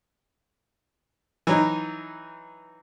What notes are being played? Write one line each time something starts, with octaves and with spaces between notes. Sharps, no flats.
E3 F#3 D#4